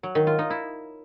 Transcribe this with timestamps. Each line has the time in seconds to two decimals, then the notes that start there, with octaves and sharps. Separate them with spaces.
0.03 F#3
0.15 D#3
0.27 F4
0.39 D#4
0.50 E4